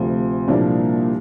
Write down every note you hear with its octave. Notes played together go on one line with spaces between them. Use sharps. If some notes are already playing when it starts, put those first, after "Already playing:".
Already playing: D2 C3 F3
C2 A#2 F3 A#3 D4